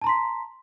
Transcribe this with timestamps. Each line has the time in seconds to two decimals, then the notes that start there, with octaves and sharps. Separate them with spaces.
0.01 A5
0.04 A#5
0.07 C6
0.09 B6